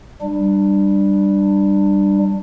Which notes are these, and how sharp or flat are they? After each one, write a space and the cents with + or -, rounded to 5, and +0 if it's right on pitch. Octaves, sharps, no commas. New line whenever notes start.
G3 +0 D4 +20